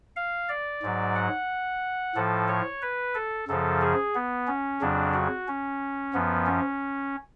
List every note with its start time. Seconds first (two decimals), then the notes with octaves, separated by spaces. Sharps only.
0.16 F5
0.49 D5
0.82 G#2 F#3
1.15 F#5
2.15 A2 F3 A4
2.48 C#5
2.82 B4
3.15 A4
3.48 F#2 C#3 F3 A4
3.81 G#4
4.15 B3
4.47 C#4
4.81 F2 C#3 F#3 D4
5.14 F#4
5.48 C#4
6.14 F#2 F3 B3
6.46 C#4